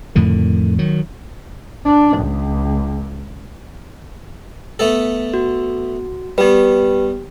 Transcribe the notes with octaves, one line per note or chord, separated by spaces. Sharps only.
F2 A2 D3 D#3
D#3 F#3
D4
C#2
A3 B3 A4
F#4
G3 B3 G4 B4